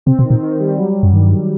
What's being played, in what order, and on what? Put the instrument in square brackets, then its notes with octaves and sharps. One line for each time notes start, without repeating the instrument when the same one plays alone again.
[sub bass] C3 [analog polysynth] C4
[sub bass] B2
[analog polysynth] D#3
[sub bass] A#2
[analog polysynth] D#3
G3
F#3
F#3
[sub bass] F#2
[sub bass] G2 [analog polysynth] D#3
[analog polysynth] F#3